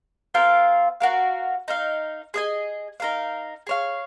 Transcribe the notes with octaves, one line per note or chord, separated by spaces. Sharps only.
C4 F4 A#4 F5
F#4 A#4 F5
D#4 A#4 F5
G#4 D#5 G#5
D#4 A#4 F5
G#4 C#5 F5